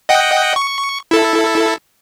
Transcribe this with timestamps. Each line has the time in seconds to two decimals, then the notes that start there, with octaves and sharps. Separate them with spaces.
0.09 D#5 F#5 G5
0.56 C#6
1.11 E4 A4